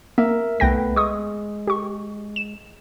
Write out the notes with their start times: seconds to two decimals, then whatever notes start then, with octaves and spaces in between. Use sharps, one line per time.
0.18 A#3 A#4 E5
0.60 C2 A3 B3 B4 G5 A#6
0.96 G#3 C#6 D#6
1.67 G4 C#6
2.36 E7